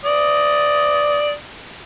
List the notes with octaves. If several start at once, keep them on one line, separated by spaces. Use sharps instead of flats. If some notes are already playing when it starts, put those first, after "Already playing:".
D5 D#6